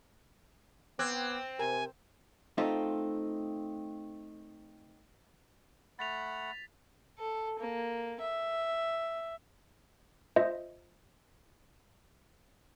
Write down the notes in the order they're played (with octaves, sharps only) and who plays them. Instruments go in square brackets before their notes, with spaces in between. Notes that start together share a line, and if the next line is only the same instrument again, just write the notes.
[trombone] B3 [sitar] C4 [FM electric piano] D6 F#6 G#6
[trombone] C3 [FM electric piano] A#4 [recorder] G#5
[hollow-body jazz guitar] A3 C4 D#4 F4
[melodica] A3 F#5 B5 [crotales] A6 B6 F7
[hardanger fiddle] A4
A#3
E5
[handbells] F4 C5 D#5 E5